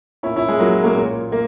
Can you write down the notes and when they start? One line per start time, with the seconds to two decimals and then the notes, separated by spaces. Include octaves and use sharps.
0.23 A#2 C#4 E4
0.36 C#4 E4
0.48 G#3
0.60 F#3 A#3
0.84 A#3 C#4
0.95 A#2
1.32 A#3